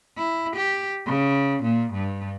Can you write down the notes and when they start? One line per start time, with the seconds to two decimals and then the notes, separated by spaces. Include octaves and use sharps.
0.17 E4
0.56 G4
1.07 C#3
1.63 A#2
1.93 G2